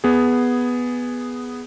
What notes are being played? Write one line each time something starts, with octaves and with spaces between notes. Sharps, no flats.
B3 G#4